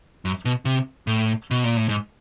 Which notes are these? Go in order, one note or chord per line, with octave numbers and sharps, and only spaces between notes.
F#2
B2
C3
A2
B2
A#2
A2
G#2